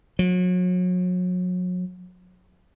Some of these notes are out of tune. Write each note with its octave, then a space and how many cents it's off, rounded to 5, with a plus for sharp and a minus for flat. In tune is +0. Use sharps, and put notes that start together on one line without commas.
F#3 -35